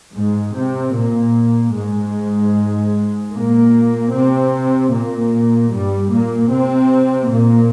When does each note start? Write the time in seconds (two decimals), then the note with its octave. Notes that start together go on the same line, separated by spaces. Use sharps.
0.15 G#2 G#3
0.54 C3 C4
0.95 A#2 A#3
1.74 G#2 G#3
3.32 A#2 A#3
4.12 C3 C4
4.92 A#2 A#3
5.71 G2 G3
6.11 A#2 A#3
6.50 C3 C4
7.30 A#2 A#3